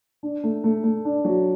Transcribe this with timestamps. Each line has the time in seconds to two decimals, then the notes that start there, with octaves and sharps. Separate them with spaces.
0.23 D4
0.44 A3
0.64 A3
0.84 A3
1.05 D4
1.25 F#3